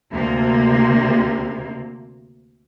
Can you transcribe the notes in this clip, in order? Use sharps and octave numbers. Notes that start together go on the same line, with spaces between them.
D2 C3 A#3